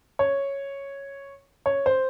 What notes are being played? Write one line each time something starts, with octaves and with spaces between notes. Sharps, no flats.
C#5
C#5
C5